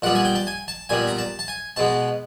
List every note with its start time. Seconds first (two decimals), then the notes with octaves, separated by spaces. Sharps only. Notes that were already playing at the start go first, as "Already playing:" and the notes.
0.02 A#2 G3 B3 F#5
0.15 G#5
0.25 G5
0.36 A5
0.47 G#5
0.68 A5
0.89 A#2 G3 B3 G#5
1.07 A#5
1.18 A5
1.39 A5
1.48 G#5
1.76 B2 G#3 B3 A5